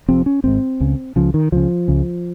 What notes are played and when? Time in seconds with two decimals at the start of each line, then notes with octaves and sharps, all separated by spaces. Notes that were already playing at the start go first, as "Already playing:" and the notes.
0.08 F1 F2 C3 C4
0.26 C#4
0.44 G#1 G#2 C4
0.80 C#2 C#3
1.16 C#2 C#3 F3
1.34 D#3
1.52 C#2 C#3 F3
1.88 C#2 C#3